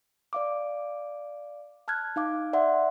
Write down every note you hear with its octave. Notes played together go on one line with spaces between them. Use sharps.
D5 F5 D6
A5 F6 F#6 G#6
D#4 F5 D6
D5 E5 F#5 C6